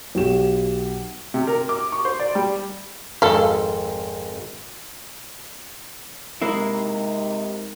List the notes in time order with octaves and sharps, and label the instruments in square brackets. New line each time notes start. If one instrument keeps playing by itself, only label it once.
[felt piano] B1 G4 E7
[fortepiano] C3
A#4
D6
C#6
C5
D5
G3
[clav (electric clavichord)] G#1 F2 G#2 [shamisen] A4 F5
[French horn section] C3 D#4 [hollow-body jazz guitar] G#3 A#3 E4